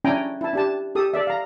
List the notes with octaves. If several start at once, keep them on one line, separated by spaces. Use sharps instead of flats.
C#4 D4 E4 G5 G#5 A#5
E4 A5
D4 G4 A5
G4 A4 D#6
A4 D5 E5
F5 A#5